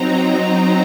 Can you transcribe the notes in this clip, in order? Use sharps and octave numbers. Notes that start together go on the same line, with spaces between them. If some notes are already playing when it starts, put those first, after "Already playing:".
Already playing: F#3 C4 D#4 A#5